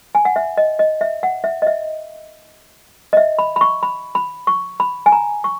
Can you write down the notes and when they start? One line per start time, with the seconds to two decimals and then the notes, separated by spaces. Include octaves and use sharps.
0.15 G#5
0.25 F#5
0.36 E5
0.57 D#5
0.79 D#5
1.01 E5
1.23 F#5
1.44 E5
1.62 D#5
1.67 E5
3.13 D#5
3.17 E5
3.39 B5
3.56 B5
3.61 C#6
3.83 B5
4.15 B5
4.47 C#6
4.80 B5
5.06 G#5
5.12 A#5
5.44 C#6